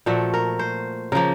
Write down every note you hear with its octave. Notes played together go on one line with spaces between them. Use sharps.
A#2 F3 A3 F#4
A#4
C5
C#3 F3 A#3 A#4